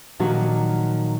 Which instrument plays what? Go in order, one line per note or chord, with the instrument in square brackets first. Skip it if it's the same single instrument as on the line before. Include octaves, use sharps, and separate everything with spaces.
[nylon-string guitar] A#2 D#3 F3 F#3 D#4 F#4